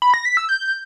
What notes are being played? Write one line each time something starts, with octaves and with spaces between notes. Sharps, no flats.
B5
A#6
B6
E6
G6